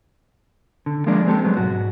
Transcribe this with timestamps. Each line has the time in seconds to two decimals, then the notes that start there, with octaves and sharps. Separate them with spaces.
0.86 D3
1.06 F3 G#3 A#3 D4 D5
1.25 G#3 C4 G4 A4
1.44 F#3 G#3 B3
1.57 B1 G#2 F#4